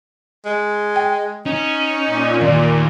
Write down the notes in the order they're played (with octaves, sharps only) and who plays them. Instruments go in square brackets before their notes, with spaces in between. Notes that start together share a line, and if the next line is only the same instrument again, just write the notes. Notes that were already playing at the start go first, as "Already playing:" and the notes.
[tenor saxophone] G#3
[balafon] G5
[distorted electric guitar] C#4 [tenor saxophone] D#4
[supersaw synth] A#2
[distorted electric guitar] D#2 [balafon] D5